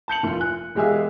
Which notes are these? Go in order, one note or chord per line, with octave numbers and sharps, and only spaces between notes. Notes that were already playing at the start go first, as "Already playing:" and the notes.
A5 G6 C#7 F#7
F1 F4
G#5 F#6
E1 G#3 G4 G#4 E5 F5